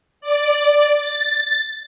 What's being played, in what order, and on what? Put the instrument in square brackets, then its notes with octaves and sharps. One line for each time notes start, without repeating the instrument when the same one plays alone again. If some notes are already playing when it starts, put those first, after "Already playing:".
[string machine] D5
A6